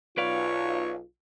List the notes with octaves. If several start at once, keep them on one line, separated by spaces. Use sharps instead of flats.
B1 F4 B4 C#5 D5 F5